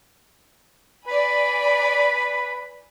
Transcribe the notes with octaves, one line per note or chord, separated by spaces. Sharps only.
B4 D5 G#5 B5